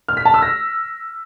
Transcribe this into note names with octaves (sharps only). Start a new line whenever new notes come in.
F6
B6
A5
E6
A#6